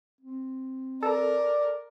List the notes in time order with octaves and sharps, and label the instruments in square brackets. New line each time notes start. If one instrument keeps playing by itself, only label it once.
[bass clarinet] C4
[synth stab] A4 [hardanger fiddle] A#4 [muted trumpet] D5